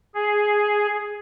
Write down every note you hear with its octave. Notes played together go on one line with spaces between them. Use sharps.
G#4